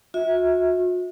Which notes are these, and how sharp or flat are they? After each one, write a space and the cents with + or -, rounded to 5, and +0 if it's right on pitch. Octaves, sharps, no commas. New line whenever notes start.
F#4 -40 E5 -30